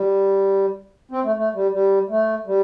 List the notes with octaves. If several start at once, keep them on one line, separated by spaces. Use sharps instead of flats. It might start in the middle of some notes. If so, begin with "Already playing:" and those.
Already playing: G3
C4
A3
A3
G3
G3
A3
G3